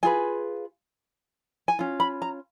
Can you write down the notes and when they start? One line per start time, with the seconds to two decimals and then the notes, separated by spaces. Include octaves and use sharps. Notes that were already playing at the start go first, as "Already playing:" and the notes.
0.03 F4 G#4 B4 G#5
1.68 G#5
1.79 C#4 F4
2.00 B5
2.22 A#5